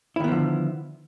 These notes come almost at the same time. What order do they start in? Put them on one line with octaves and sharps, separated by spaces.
E4 D#3 B3 F3 D3